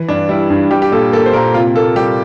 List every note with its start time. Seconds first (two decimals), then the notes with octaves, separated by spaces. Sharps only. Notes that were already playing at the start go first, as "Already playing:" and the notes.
Already playing: E3
0.08 G2 D4
0.29 G3 E4
0.50 G2
0.71 G3 G4
0.82 G4
0.92 A#2 A4
1.12 A#3 A4
1.26 C5
1.34 A#2 A#4
1.54 C3 F4
1.76 A#3 A4
1.96 G3 G4